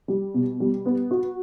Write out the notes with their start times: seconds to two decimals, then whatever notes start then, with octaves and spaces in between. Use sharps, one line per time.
0.08 G3
0.34 B2
0.60 G3
0.85 B3
1.11 F#4